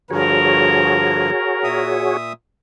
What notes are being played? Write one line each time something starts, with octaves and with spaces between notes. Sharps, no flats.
G2 D3 F3 F#4 G#4 A#4 C#5
A#2 E5 D#6